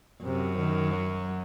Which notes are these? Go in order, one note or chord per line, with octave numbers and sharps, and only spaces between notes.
F#2 C3
D#3
F#3